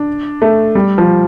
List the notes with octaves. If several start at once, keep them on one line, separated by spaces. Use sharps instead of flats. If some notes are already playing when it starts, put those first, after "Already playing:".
Already playing: D4
A3
G3
F3